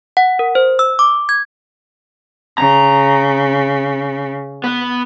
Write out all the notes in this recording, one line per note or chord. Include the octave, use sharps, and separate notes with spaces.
F#5
A#4
C5
E6
D6
G#6
C#3 A#5
B3